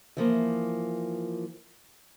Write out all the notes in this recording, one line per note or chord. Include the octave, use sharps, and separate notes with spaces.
E3 F3 A#3